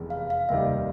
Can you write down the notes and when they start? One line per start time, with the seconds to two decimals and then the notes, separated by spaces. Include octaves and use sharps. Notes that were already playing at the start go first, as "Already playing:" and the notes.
Already playing: F1 E2 C3 E3 G#3
0.10 F5
0.30 F5
0.49 F1 D#2 D#3 G3 E5